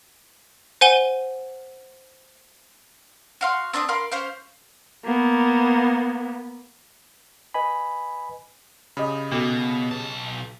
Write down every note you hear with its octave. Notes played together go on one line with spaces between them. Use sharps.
C5 F#5 G#5 D#7 G7
F#4 F5 C6
C4 D4 C#6 D#6
A#4 F5 B5 C6
C#4 C5 F5
A#3 B3
B4 D#5 G#5 B5
C#3 G4 D#5 B5
B2 B3 F#4 A4
B1 A5